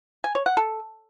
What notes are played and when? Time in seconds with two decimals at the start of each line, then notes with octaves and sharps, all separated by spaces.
0.24 G#5
0.35 C#5
0.46 F#5
0.57 A4